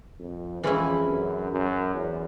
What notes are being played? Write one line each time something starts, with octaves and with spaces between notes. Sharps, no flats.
F2
F2 E3 G#3 C#4 E4
F#2
F#2
E2